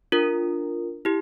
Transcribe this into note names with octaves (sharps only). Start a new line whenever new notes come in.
D4 F4 A#4
E4 G4